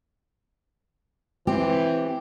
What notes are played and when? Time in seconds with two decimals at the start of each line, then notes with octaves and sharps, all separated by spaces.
1.47 E3 C4 G4